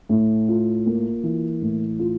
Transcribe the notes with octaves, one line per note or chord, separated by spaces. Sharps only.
A2
F4
A#3
E3
A2
F4